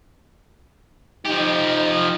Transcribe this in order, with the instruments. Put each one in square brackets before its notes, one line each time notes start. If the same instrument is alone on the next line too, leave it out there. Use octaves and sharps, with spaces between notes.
[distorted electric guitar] F3 G4 [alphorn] D#4